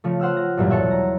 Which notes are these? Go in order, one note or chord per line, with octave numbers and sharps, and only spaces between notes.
C#3 F3 A3
C5 F#5 G5 E6 F6
A#6
B1 E2 G2 A#2 F#3 G3
A4 C#5 E5 F#5
A#5